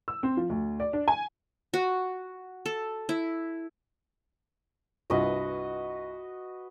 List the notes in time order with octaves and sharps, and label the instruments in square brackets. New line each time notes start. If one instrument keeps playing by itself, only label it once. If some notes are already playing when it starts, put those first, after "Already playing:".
[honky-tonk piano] E6
C4
F3
D2
D5
D4
G#5
[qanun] F#4
A4
E4
[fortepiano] C2 G2 F4 [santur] F#4 B4 D#5